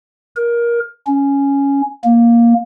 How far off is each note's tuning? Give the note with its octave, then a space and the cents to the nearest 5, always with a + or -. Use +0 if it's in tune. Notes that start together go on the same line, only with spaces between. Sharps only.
A#4 +20
C#4 +5
A#3 +5